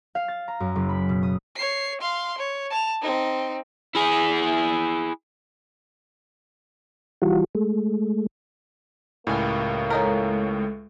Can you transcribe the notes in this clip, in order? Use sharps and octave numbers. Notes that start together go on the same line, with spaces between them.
F5
A6
A#5
F#2
F#1
B5
B2
D#6
C#5 C7
F5 C6
C#5
A5 F7
C4 D#4
E4 G#4
E3 G3 F4 F#4
G#3 A3
C#2 A2 G3 A#3 G#5
G#3 C#4 D#4 A4 A#4